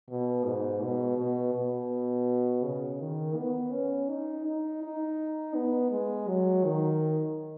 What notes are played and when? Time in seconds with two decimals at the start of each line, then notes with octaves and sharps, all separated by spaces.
0.09 B2
0.46 G#2
0.82 B2
1.18 B2
1.54 B2
2.63 C#3
3.01 D#3
3.37 B3
3.72 C#4
4.10 D#4
4.45 D#4
4.83 D#4
5.55 B3
5.91 G#3
6.28 F#3
6.65 D#3